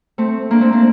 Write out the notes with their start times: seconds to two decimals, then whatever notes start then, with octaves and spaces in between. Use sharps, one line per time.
0.18 A3 C4
0.51 A#3 D4
0.61 A3 C4
0.72 A#3 D4